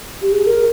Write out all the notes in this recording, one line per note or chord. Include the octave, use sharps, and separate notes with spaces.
G4
G#4
A#4